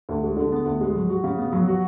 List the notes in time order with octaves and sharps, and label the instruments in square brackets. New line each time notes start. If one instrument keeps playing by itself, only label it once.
[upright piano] D2
G#3
D3
B3
D2
G#3
F#3
F#4
C#3
B3
F#3
F#4